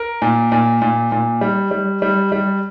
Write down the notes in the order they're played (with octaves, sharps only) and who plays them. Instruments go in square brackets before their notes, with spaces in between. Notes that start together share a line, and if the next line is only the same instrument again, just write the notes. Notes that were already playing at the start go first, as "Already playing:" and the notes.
Already playing: [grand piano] A#4
A#2
A#2
A#2
A#2
G3
G3
G3
G3